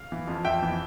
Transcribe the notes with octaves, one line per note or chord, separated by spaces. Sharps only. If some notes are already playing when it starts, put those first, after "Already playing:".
Already playing: F5
E3
F2
F2 E5 G5
E3